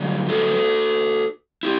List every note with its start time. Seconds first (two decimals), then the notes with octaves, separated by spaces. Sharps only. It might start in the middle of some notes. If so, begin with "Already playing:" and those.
Already playing: G2 D3 F#3
0.28 F#4 A4
1.63 E4 G4